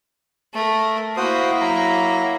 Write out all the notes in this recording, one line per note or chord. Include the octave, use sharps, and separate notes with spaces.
A3 A#4
A#3 E4 F#4 C5 D#6
F#3 A#5